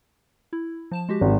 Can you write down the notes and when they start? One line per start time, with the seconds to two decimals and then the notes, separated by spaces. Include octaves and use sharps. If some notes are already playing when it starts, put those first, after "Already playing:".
0.53 E4
0.91 F3 A5 E7
1.09 G#3 F#4 G4
1.21 G#1